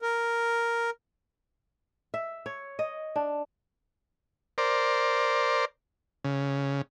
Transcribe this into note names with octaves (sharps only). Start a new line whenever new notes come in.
A#4
E5
C#5
D#5
D4
A#4 C5 D5
C#3